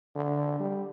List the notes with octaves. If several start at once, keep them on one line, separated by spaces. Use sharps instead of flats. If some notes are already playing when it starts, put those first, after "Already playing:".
D3
G3